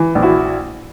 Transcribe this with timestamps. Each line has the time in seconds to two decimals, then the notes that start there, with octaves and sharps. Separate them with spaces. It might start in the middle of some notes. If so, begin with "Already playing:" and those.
Already playing: E3
0.15 A#1
0.22 E4 F#4